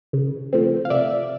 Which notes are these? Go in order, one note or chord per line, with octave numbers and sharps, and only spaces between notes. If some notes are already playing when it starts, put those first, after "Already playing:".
C#3
F3 A3 C4
F5
C3 D5 E5